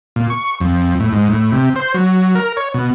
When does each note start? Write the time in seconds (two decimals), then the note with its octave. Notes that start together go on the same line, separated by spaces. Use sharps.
0.16 A#2
0.30 C#6
0.60 F2
1.00 A2
1.13 G#2
1.30 A2
1.52 C3
1.76 C5
1.94 F#3
2.35 A#4
2.57 C#5
2.74 B2